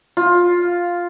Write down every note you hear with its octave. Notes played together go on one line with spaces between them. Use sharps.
F4